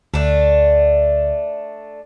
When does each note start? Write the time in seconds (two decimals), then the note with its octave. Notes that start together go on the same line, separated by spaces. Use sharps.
0.14 D2 A3 D4